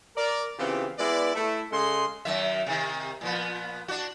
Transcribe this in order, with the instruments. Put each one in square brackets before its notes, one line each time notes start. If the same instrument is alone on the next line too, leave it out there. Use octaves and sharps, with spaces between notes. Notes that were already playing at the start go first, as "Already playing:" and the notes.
[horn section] A#4 D5
C#3 E3 B3 C4 F4 G4
G#3 B3 E4 B4 D5
A3 E4
C#3 G#3 G#4 A4 C6
[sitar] F#2 D#3 E5
C3 D#3
A#2 F3 B3
D4 F#4